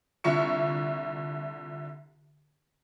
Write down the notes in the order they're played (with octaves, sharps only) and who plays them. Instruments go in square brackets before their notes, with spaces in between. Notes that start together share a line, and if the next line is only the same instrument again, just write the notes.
[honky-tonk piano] C2 D3 F4 E5 C#6 C#7